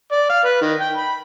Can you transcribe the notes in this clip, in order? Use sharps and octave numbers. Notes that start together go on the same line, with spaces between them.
D5
F5
B4
D#3
G5
B5